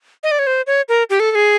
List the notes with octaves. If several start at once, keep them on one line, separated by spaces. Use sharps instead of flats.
D#5
D5
C#5
C5
C#5
A#4
G4
A4
A4
G#4